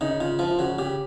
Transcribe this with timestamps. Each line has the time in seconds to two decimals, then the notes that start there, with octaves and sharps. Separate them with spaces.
0.01 C#3 D#4
0.20 C#3 F4
0.39 F3 F4
0.51 F4
0.59 C#3 F#4
0.79 C#3 G4